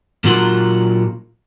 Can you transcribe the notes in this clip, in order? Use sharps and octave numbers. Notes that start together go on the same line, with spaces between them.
A#2 F#3 F4 A#4 F#5 C6